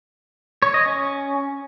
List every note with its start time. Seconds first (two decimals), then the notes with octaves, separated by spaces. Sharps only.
0.62 C#5
0.74 D#5
0.86 C#4